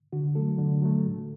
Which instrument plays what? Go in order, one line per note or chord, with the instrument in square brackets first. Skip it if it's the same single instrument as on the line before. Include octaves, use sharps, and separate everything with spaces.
[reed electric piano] D3 F#4
F#3 A3 A4
D3
F#3 A3
A2